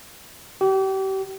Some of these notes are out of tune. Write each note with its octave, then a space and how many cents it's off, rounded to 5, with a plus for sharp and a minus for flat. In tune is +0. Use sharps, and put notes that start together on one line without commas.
G4 -35